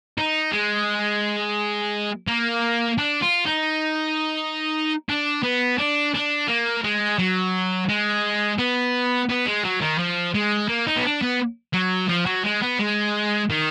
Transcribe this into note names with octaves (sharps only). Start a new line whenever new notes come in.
D#4
G#3
A#3
D4
F4
D#4
D4
B3
D4
D4
A#3
G#3
F#3
G#3
B3
B3
G#3
F#3
D#3
F3
G#3
A#3
D#4
B3
D4
B3
F#3
F3
F#3
G#3
B3
G#3
D#3